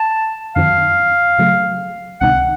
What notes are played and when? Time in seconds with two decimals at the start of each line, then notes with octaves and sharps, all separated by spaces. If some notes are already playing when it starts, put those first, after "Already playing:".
Already playing: A5
0.56 F#2 D#3 F#3 C4 F5
1.39 C#3 F#3 A3
2.21 C#2 C3 D#3 F#5